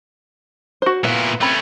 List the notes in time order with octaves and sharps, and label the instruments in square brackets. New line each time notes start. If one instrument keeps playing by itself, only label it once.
[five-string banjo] F#4 C5
[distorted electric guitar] A#2 E4 [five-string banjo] B3 F5
[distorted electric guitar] A3 C#4 [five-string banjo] C4 B5